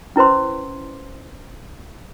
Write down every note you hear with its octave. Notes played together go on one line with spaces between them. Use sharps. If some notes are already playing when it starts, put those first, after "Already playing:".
C#4 E4 B4 C5 C6